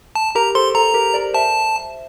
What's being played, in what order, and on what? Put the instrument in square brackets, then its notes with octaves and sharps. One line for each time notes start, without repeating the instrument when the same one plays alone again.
[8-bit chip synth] A5
[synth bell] G4 A#4 [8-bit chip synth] A#5
[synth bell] A4 C5 [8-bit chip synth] C6
[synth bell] A4 [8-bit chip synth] A#5
[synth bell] G4 A#4
A#4 D5
[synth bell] C5 E5 [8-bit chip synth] A5